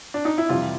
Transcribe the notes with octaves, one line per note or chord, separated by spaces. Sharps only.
D4
D#4
E4
F2 C3 E3 G3 F4